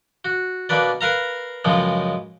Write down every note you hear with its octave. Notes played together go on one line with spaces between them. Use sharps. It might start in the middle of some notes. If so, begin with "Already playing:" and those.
F#4
B2 A#3 D4 B4 D5
A#4 B4 F5 A#5
C#2 F#2 C#3 F3 G#3